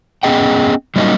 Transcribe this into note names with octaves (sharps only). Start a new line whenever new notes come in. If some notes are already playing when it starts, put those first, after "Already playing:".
B3 C#4 G#4 D#5 G5
F#3 G3 A#3 C#4 D#4 D#5